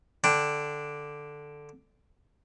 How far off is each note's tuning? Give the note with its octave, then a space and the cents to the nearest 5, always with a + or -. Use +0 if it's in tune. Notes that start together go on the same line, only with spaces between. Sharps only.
D3 +0 D4 +0 G5 +0